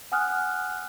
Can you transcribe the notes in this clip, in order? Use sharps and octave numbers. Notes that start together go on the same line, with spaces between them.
F#5 G#5 D#6 F6 F#6